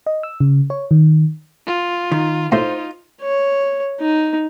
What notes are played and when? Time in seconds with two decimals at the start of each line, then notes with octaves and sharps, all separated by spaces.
0.06 D#5
0.23 E6
0.40 C#3
0.70 C#5
0.91 D#3
1.67 F4
2.12 D#3
2.52 A2 D#4 F4 C5
3.22 C#5
4.00 D#4